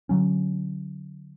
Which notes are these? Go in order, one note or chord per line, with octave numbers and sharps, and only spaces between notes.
D3 F#3 C#4